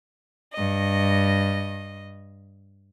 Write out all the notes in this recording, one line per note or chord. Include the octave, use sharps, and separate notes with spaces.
G2 D#5